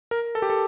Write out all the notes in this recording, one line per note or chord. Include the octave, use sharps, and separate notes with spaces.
A#4
A4
G4
A4